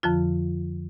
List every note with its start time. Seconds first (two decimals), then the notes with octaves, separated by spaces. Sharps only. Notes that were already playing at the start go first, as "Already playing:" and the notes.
0.03 F2 D3 F3 F4